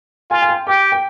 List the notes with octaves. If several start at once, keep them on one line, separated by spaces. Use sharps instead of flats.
F4 G#5
G#5
G5
G4 G5
G5